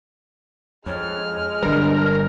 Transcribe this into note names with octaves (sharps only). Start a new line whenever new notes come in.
F2 G#3 C#5 F6
G1 G3 D4 A#4